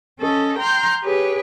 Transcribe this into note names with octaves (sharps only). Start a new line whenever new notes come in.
C#4 A4 D#5
G5 A#5 C6 F6 G6
G4 G#4 B4 C#5